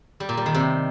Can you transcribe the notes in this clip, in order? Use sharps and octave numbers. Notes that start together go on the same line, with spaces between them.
G3
A#2
G3
D#3
C3